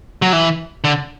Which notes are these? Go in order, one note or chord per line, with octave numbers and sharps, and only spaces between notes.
F#3
E3
D3